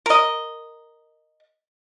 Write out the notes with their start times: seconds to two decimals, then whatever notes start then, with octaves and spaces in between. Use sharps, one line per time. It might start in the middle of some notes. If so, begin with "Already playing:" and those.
0.06 A#4 D#5